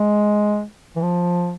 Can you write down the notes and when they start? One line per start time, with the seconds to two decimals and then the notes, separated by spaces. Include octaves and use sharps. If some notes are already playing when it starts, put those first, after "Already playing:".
Already playing: G#3
0.96 E3
1.02 F3